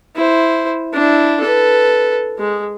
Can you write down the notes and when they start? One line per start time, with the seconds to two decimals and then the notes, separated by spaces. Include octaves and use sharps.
0.15 E4 C5
0.93 D4 E4
1.40 A4 B4
2.38 G#3